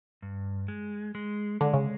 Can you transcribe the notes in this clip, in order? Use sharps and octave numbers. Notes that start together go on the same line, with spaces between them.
G2
G#3
G#3
D3 G#3
C#3